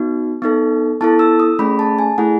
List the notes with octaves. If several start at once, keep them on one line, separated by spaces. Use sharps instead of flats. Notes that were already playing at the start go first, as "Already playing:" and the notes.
Already playing: B3 D#4 F#4
B3 D#4 A4
B3 E4 A4 A5
E6
D#6
A3 C#4 G#4 B5
A5
G#5
A3 E4 G#4 F#5